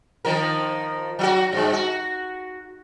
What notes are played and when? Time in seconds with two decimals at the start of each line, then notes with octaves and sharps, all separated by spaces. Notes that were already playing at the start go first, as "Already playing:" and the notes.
0.25 D#3 F3 A#4
1.19 F#3 F4 F#4
1.52 G2 G#3
1.73 F#4